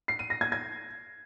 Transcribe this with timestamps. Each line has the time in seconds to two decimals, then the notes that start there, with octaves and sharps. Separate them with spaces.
0.08 C7
0.19 D#7
0.30 A#6
0.41 G#6
0.52 G#6